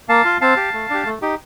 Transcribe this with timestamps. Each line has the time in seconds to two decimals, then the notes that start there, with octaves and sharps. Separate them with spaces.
0.09 A#3 F5 A5
0.25 F4
0.41 C4 F5 A5
0.57 G4
0.74 A3
0.90 D4 G4
1.05 A3
1.22 D#4 G4